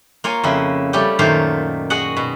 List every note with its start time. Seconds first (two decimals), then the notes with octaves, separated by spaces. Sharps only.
0.24 A#3 F4 C#5 G#5
0.43 F2 C#3 E4 D#5
0.93 G3 A3 C#4 G4
1.19 F#2 A#2 D#3 A3 C5 F5
1.90 F#4 G#4 D#5 F#5
2.17 B2